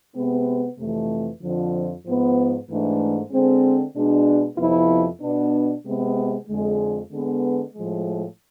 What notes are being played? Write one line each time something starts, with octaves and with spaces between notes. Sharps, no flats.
C3 G#3 B3
F2 C3 E3 A3
F2 D3 F3
G#2 F3 B3
G#2 E3 A3 D4
D3 G#3 C4
B2 G#3 D4
F2 C3 F3 B3 E4
B2 B3 D4
C3 G#3 B3
F2 D3 G#3
D3 G#3 B3
A2 F3 G#3